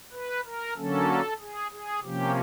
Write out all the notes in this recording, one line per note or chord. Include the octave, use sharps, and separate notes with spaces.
B4
A#4
D3 F#3 A#3 C#4 A4
G#4
G#4
C3 F3 A#3 C#4 G4